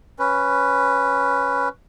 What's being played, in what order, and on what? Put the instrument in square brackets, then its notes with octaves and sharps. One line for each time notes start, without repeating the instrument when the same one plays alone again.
[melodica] C#4 B4